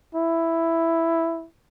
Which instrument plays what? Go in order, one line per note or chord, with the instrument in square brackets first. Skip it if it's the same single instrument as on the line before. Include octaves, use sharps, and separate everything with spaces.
[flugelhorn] E4